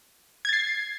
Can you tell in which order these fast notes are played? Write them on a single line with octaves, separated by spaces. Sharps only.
G#6 A6 C7